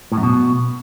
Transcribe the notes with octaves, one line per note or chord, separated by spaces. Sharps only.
A2
F#2
B2